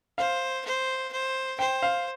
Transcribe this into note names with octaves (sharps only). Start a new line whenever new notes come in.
C5 F5
C5
C5
C5 G5
F5